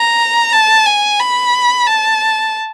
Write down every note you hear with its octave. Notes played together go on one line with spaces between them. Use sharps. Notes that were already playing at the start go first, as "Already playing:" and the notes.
Already playing: A#5
A5
G#5
B5
A5